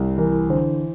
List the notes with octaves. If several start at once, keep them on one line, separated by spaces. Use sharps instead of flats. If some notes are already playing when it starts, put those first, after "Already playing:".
Already playing: C2
E3 A#4
D3 C5